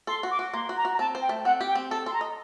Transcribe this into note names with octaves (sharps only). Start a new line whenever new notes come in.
A4 C6
F#4
D6
F#4
A#3 C6
F#4
A#5
F#4
A#5
C4 A5
C5
G5
A3
C4 F#5
G4
G5
C4
A4 A5
A4 C6
A#5
D#5